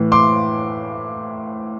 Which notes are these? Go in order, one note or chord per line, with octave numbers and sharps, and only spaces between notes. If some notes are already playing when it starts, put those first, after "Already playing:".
Already playing: A2 E3
C6 D6